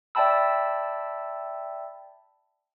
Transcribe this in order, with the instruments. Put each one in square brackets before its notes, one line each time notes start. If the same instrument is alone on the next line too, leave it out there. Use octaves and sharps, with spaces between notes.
[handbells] D5 E5 G5 A5 B5 E6